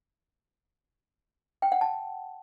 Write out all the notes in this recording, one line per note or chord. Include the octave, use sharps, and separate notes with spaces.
G5
F#5
A5